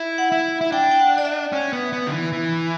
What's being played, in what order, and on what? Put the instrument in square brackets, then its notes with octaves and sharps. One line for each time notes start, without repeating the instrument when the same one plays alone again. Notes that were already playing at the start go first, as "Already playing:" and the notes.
Already playing: [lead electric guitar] E4
[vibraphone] F#5
[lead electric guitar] E4
E4
[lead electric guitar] D4 [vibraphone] G5
[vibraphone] G5
F#5
D5
E5
[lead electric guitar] C#4
B3
B3
D3
E3
E3